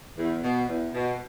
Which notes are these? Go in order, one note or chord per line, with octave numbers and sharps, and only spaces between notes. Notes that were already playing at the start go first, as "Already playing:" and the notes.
E2
B2
E2
B2